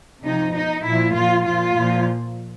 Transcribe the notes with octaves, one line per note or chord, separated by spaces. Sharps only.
C3 F3 D#4
B2 D#4
A#2 F3 E4
A#2 F3 F4
A#2 F3 F4
A#2 F3